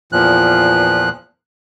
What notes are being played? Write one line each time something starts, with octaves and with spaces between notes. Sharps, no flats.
E2 A#2 F3 F#6